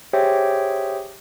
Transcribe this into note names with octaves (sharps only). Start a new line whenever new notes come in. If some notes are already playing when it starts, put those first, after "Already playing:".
G4 G#4 C5 C#5 E5 G5